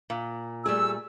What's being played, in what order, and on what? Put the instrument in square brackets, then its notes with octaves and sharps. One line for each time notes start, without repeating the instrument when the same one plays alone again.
[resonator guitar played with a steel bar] A#2
[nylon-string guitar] G3 A3 G#4 [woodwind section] E6